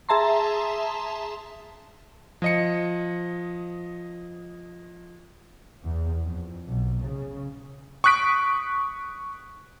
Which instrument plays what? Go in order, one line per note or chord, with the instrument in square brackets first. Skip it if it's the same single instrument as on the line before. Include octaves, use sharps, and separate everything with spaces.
[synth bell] G#4 E5 A5 A#5 C6
[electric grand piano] F3 D#5 C#7
[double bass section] E2
F2
B1
C#3
[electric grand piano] C#6 D#6 F#6 B6 D7